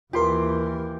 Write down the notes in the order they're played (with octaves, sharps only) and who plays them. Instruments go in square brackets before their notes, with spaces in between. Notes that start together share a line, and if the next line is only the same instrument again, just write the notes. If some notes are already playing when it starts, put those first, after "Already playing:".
[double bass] D#2 E3 [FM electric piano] F4 A#4 [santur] G4 C6